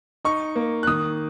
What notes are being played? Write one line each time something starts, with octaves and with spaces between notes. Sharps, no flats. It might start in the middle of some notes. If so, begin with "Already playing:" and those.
D#4 C#6
A#3
F#6
D#3 D#6